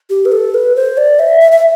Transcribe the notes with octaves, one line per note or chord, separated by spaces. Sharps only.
G4
B4
A4
B4
C5
D5
E5
E5
E5